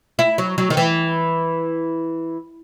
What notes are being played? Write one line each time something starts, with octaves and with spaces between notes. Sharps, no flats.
E4
F#3
F#3
D#3
E3